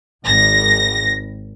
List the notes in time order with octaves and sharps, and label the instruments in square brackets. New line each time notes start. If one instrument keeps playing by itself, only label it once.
[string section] G#1 A#6